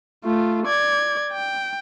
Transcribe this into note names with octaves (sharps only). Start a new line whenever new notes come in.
A3 F4
D5 G#6
G5